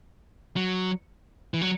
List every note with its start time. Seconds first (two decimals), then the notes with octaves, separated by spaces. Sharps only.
0.56 F#3
1.54 E3
1.61 F#3